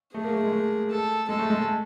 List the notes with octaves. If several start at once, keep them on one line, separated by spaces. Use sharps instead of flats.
A3 G#4
A#3
A3
G#3
A3
A4
G#3 A4
A3
G#3
A3